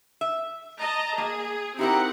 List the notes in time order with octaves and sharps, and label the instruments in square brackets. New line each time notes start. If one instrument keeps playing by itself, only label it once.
[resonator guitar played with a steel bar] E5
[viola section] D#5 A5 A#5
[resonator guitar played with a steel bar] A#3 [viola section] G#4
[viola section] C4 F#5 [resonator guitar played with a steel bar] D#4 E4 A#4 [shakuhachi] G4